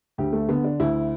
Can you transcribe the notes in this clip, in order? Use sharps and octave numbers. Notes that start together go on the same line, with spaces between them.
D2 G4
A3
D3 B3
D4
D2 E4